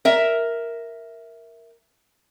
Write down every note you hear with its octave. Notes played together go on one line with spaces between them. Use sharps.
A#4 E5